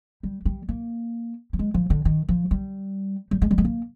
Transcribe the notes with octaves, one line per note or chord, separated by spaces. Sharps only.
G3
G3
A#3
G3
G#3
F3
D3
D#3
F3
G3
G3
G#3
G3
G#3
A#3